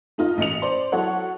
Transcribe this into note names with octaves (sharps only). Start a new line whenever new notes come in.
A3 D#4 F4 D#5
A1 D#5 C#7 F7
C5 D5 C6
F#3 E4 A4 C#5 F#5